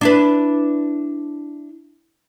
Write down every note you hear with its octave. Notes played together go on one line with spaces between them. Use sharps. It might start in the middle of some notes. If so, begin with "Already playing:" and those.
D4 E4 B4